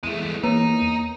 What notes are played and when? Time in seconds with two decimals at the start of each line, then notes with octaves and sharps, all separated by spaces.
0.03 E2 G#3 A3
0.43 A#3 D#4 B4 C#5 A#5